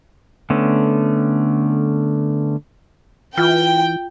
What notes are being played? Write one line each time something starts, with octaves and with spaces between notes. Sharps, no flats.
D3 A3 B3 C#4
E3 F4 G5